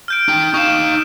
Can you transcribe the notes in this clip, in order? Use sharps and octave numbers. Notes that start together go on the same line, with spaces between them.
F6 G6 D7
D#4 G5
D#4 F5 C#6 E7